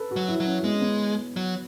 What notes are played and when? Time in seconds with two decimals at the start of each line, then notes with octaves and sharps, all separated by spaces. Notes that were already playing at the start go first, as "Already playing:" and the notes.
Already playing: A4 B4
0.11 F#4
0.16 F#3
0.28 E4
0.40 F#3
0.46 C#4
0.64 G#3 B3
0.72 C#4
0.81 B3
1.36 F#3